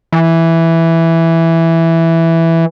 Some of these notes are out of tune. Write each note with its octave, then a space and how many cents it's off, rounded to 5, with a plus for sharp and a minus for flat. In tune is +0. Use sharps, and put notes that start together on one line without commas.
E3 +0